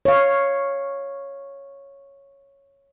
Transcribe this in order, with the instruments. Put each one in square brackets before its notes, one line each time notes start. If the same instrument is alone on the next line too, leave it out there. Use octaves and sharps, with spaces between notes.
[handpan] C#5 F5